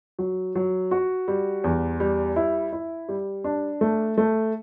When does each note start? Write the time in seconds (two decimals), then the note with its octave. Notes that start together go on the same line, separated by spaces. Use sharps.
0.19 F#3
0.55 F#3
0.91 F#4
1.28 G3
1.64 E2
2.00 G3
2.36 E4
2.73 E4
3.09 G3
3.44 D4
3.81 A3
4.18 A3